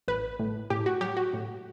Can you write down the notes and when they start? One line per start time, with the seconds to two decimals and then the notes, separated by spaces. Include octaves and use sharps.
0.08 A1 B4
0.39 A2
0.70 A2 G4
0.86 F#4
1.01 F#3 G4
1.17 F#4
1.33 A2